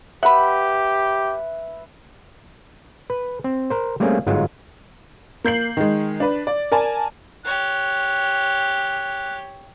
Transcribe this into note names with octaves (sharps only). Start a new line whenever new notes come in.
G4 B4 E5 F#5 B5
B4
C4
A#4 C5
G3 A3 A#3 C4 C#4 G#4
G1 G#2 F#3 G#3 F4
A#3 G6 C7 F#7
D#3 G#3
D4 B4
D5
A#4 D5 G#5 A5
G4 C#5 F#6